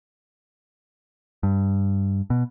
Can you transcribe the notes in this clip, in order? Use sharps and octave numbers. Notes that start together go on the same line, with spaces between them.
G2
B2